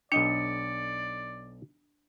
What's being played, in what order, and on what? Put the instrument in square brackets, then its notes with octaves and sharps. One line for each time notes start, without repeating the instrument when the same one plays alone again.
[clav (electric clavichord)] B1 D#5 G5 [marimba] D4 [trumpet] D5 [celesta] C#7